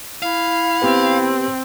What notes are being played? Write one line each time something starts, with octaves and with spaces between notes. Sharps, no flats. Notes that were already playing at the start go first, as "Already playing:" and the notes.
E4 F5
B3 C4 G4 B4